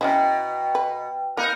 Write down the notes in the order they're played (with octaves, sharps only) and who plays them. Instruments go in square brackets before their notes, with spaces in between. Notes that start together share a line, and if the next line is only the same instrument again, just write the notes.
[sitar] B2 [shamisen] C#4 D#4 E4 [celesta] D#5 A#5 [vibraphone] G5
[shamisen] B4
[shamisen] A#3 [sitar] D#4 A#4 [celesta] B5 F#6